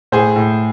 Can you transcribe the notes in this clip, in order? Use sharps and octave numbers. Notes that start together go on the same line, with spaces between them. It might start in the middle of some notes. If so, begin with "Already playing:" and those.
A2 G#4 C5
A2